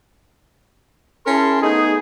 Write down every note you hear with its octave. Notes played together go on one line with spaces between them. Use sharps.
C#4 E4 G#4 A#4 A5 C6
A3 B3 D#4 G#4